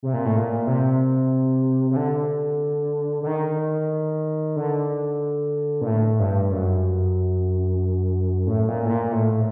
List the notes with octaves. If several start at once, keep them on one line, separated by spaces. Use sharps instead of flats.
C3
A#2
A2
A#2
C3
C3
D3
D3
D#3
D3
A#2
A2
G2
F#2
A2
A#2
A2
A#2
A2